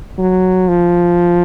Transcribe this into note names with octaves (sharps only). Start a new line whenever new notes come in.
F#3
F3